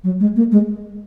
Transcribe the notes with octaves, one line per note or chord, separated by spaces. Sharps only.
F#3
G#3
A#3
G#3